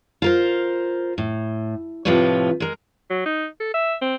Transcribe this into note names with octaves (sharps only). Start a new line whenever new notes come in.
F4 A#4 C5
A2
A2 C3 F3 F4 B4 C#5
G#3 A#4
F#3
D#4
A4
E5
C4